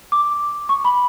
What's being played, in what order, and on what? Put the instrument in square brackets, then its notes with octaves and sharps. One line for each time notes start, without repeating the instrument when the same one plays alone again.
[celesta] D6
C#6
B5